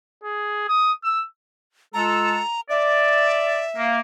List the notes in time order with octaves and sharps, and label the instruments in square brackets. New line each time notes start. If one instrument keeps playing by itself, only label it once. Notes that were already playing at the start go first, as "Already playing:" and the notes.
[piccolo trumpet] G#4
D#6
E6
[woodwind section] G#3 F4 A4 [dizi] A#5
[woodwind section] D5 [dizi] E5
[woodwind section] A#3